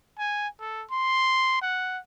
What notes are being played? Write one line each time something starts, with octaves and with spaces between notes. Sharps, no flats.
G#5
A4
C6
F#5